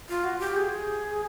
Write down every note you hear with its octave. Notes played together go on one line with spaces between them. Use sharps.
F4
F#4
G4
G#4